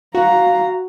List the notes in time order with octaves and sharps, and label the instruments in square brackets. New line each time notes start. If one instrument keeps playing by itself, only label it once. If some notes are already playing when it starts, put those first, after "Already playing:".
[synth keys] F#4 [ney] F5 [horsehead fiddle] A#5